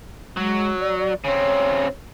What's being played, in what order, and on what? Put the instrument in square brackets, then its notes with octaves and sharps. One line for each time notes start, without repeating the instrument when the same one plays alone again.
[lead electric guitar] F#3 [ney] G#3
[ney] D5
D5
[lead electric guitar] C#3 C4 [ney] C#5